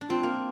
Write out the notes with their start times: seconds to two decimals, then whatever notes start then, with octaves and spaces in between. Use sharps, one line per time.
0.01 D4
0.09 C4 F4
0.23 A#3